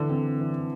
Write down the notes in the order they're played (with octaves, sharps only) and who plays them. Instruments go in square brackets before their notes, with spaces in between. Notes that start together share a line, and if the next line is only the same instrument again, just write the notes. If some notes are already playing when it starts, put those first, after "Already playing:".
Already playing: [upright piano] D3 [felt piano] E3
[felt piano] C4
E3